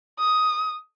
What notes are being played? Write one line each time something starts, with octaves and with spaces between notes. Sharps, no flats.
D#6